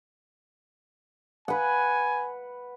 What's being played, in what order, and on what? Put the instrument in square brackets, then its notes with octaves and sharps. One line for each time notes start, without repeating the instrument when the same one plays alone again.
[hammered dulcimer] B4 F#5 [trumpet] G#5